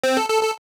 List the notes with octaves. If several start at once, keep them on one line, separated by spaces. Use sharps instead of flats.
C4
A4
A4
A4